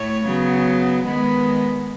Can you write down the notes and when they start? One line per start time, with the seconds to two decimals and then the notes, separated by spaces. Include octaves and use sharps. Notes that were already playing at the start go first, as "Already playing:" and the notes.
Already playing: A2 A3 C#5
0.26 C#3 F#3 B3
1.06 D#3 G#3 B3 B4